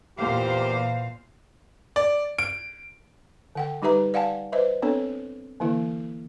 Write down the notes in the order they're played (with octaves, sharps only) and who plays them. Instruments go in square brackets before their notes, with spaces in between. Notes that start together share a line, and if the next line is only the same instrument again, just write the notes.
[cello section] E2 C5 F5 [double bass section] A#2 [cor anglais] G4
[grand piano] D5
D7
[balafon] D3 F#5 G5
G3 D#4 G4 B4 E5 A#5
D5 F5 F#5 G#5 A5
B4 C5 D#5 E5
B3 C4 D4 A4 C#5
D3 E3 A#3 E4